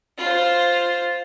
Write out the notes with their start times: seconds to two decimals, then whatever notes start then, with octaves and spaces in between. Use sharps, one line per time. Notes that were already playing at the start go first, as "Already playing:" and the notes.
0.18 F4 C5